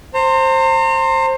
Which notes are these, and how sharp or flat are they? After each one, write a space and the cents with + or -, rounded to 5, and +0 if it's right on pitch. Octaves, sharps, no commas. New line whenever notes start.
C5 +15 A#5 -40